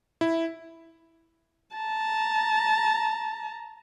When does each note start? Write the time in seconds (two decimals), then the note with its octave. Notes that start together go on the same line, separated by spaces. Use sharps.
0.21 E4
1.76 A5 A#5